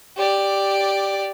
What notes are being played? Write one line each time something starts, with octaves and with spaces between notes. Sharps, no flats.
G4 D5